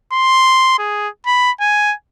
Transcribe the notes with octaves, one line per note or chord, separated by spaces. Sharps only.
C6
G#4
B5
G#5